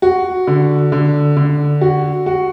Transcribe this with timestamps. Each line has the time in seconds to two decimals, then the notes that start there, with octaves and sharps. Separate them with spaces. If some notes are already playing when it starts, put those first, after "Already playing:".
0.02 F#4
0.47 D3
0.92 D3
1.37 D3
1.81 F#4
2.26 F#4